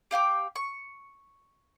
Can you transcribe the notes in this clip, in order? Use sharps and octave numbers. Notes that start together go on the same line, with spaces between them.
G4 F5 G5 D6
C#6